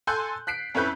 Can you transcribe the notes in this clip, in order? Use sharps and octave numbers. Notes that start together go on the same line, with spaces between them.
A4 G#5 C6 F#6 G6
F#6 B6 C7 D7
F2 C#4 E4 B4 G6